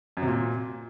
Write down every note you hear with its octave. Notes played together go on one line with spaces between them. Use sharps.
F#2
C3
A#2